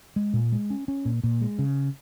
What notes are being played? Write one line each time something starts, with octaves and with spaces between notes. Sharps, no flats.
G#3
A#2
G#3
C#4
C#4
A#2
A#2
G#3
C#3